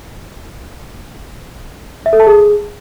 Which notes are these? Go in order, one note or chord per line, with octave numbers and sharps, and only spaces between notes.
E5
A4
A5
G#4